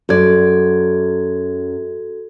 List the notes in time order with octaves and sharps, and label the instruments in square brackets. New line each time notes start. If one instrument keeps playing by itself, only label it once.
[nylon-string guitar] F#2 D5 [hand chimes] F#4 A4 G#6